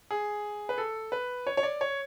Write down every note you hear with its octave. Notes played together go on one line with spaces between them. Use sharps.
G#4
B4
A4
B4
C#5
C#5
D5
C#5